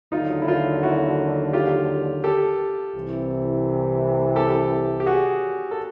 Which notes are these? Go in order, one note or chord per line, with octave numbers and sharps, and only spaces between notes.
D#2 D3 F#3 D#4 F4
E4
D#4 F4
E4 F#4
F4 G4
G4 A4
C2 C3 E3
G4 A4
G4
F#4 G#4
A4